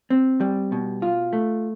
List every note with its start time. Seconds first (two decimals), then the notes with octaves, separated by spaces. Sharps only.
0.10 C4
0.41 G3
0.72 B2
1.02 F4
1.33 A3